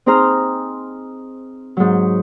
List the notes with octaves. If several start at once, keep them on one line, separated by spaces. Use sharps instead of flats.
C4 D#4 G#4 C5 A#5 F6
G#2 F#3